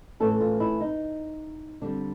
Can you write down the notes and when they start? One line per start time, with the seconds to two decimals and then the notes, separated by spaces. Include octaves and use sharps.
0.20 A2 E3 A3 C#4 A4
0.41 F4
0.60 E4
0.81 D#4
1.81 D3 G3 C4 D4